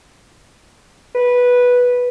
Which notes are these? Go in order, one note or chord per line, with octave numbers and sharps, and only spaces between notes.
B4